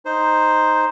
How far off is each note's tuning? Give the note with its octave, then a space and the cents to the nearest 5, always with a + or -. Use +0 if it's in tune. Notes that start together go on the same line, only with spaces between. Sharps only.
D#4 +0 C5 +0